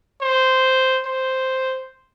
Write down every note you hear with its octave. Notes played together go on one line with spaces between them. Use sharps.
C5
C5